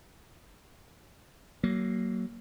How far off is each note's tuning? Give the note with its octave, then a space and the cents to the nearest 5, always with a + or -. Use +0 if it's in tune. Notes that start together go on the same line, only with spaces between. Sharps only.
F#3 +25 A#3 +0